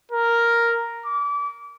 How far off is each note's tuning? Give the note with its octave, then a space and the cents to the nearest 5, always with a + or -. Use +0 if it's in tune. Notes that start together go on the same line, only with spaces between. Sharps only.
A#4 +0
D6 -30